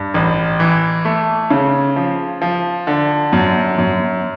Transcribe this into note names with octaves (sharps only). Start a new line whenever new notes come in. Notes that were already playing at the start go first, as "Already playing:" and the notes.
Already playing: G2
A1
E3
A3
C#3
F3
F3
D3
F#2
F#2